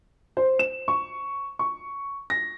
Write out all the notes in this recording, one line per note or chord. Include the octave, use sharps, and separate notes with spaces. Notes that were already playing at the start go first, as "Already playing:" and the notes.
C5
E7
C#6
C#6
A#6